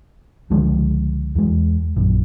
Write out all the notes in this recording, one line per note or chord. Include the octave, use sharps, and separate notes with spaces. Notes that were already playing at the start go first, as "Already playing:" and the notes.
C#2 D3 F3 G#3
E2 G#3
A#1 F#2